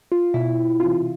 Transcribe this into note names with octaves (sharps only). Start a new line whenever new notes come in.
F4
B2 E4
C3 E3 F4